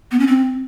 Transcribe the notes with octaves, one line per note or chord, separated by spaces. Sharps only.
B3
C#4
C4